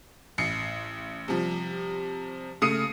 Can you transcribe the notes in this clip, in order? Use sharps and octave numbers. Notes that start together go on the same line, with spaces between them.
A1 C7 C#7
C3 F3 G3
C#3 A3 D#6 C7 C#7 D#7